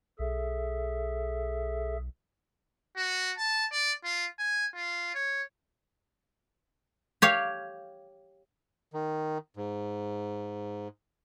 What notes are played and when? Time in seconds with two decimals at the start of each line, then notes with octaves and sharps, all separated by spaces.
0.19 B1 G#4 A4 E5
2.97 F#4
3.37 A5
3.71 D5
4.04 F4
4.39 G#5
4.74 F4
5.14 C#5
7.22 G4 C#5 F5
8.93 D#3
9.57 G#2